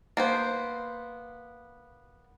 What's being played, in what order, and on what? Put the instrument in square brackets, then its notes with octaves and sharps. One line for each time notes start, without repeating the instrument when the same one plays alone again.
[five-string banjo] A#3 B3 C5